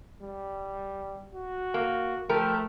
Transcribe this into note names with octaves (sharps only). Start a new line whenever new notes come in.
G3
F#4
A#3
F3 A3 G4 A#4